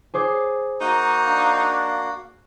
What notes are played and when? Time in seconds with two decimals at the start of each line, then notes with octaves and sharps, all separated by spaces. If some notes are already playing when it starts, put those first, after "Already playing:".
0.14 G#4 C5 D6
0.81 A#3 D#4 F#4
1.24 D4 F5